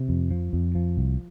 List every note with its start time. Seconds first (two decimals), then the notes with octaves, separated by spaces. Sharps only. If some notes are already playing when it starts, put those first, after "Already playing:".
Already playing: C3
0.09 F2
0.31 F3
0.53 F2
0.75 F3
0.97 C2